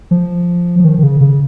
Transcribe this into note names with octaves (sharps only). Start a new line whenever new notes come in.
F3
F3
D#3
D#3
C#3
C#3